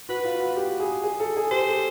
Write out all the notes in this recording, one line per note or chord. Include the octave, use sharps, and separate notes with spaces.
F#4 B4
F4
F#4
G4
G#4
G#4
A4
G#4
G4 C5
A4